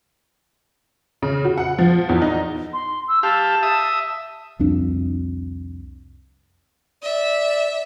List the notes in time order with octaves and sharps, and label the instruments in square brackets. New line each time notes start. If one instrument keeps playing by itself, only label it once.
[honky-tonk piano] C#3
F#4
F#5
F3
E2
D#4
[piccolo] C6
E6
[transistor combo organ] G4 F5 [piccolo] A5
[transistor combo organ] E5 D#6
[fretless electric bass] C2 F2 D4
[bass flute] D5 [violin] E5